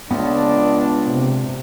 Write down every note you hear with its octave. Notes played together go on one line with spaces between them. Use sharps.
C#2 B3 D4 A5
C3